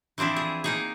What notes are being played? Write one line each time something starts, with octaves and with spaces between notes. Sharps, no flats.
E3 F3 C4 D4 E4
G#4
A#3 D#4 G#4